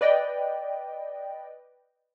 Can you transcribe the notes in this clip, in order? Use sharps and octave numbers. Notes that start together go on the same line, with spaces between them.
B4 D5 D#5 G5